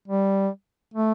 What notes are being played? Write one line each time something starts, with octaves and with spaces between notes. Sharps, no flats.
G3
A3